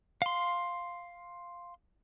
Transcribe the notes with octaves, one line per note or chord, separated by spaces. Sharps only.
F5 C6